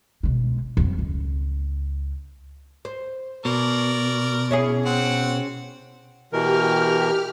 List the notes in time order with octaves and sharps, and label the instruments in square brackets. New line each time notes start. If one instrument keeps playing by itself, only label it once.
[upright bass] B1 G#3
F2 F#3
C#2
[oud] C5
[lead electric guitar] B2 [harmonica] A#4 D5
[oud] C#4 E4 G#4
[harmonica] C4 F#5
[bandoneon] B2 E3 A#4 [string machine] G4 F6